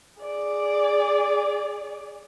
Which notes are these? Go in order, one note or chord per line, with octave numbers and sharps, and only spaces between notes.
G#4 D5